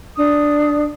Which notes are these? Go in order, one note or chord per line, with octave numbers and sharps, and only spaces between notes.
D4 D#6